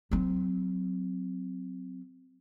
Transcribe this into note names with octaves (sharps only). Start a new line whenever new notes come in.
F#3 C4